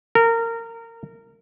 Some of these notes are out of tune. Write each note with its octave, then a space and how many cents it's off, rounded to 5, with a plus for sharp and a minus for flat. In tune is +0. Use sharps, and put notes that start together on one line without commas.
A#4 -25